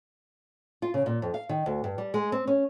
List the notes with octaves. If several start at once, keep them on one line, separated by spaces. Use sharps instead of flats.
F4
C#3
A#2
F2
F5
D#3
D2
G2
G3
G#3
C4
C#4